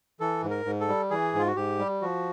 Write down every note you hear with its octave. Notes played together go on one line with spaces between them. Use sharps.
E3 A4
G#2
A#4
G#2
A4
G3
E3 G#4
G#2 F4
F#4
G#2 G4
G3
F3 F#4